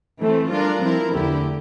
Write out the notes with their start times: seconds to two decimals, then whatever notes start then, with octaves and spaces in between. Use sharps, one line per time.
0.22 E3 A3 C4
0.52 G3 D4 F4 A#4
0.83 F3 C4 E4 A#4
1.15 E2 D3 A3 E4 G4